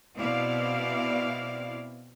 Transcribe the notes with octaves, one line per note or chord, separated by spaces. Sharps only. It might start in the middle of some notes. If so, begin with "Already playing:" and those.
B2 C4 E4 D5 F5